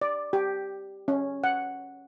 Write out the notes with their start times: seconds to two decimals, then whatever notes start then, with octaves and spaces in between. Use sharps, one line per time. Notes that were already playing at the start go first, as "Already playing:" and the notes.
0.02 D5
0.33 G4
1.08 C#4
1.44 F#5